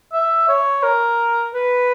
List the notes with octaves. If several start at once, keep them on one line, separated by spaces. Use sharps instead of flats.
E5
C#5
A#4
B4